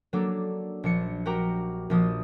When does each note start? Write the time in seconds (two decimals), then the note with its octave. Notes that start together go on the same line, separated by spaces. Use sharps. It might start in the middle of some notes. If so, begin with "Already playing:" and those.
0.13 F#3 A#3 D4 A4
0.83 A#1 F3 C#7
1.26 F#4 G4 A#4 A#5
1.90 A#1 F3 D#6